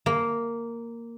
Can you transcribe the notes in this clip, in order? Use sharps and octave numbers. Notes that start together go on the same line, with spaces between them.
A#3